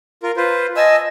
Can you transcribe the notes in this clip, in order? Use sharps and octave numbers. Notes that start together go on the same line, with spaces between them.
F4 A#4
F4 B4 C5
D#5 G#5 A5 E6